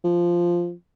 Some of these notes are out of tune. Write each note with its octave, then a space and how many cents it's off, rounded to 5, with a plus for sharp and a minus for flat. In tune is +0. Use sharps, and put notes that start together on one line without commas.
F3 -5